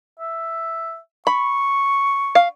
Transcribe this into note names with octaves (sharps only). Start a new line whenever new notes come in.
E5
B5 C#6
F5